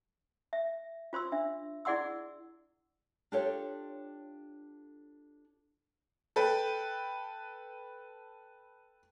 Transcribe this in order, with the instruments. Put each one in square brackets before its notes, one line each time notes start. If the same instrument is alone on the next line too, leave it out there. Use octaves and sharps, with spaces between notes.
[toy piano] E5
F4 C5 C6 E6
D4 E5
E4 G#4 D5 F#5 C6 E6
[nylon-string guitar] D4 F4 G4 A4 C#5
[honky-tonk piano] A4 B4 G5